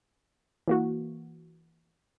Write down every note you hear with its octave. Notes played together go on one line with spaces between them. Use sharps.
E3 A#3 F#4